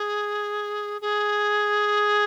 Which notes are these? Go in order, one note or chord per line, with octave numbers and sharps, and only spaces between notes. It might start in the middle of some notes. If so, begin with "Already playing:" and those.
Already playing: G#4
G#4